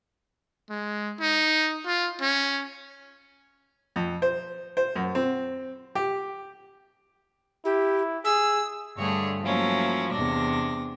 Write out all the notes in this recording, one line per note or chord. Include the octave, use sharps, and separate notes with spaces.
G#3
D#4
F4
C#4
F2
C5
C5
F#2
C4
G4
E4 G4
G#4 E6
G2 D3 A3 G#4 C#5
F3 F#3 A3 A#3 C#4 E4
E2 C3 D4 A#6